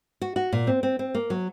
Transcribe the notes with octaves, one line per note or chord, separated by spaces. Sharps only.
F#4
F#4
A#2
C4
C4
C4
A#3
F#3